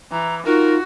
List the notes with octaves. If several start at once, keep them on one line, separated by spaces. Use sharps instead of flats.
E3 A#5
D#4 F4 F#4 A#4